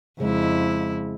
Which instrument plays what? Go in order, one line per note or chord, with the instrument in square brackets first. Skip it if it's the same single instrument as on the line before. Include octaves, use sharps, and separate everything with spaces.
[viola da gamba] F2 E4 [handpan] C#3 G#3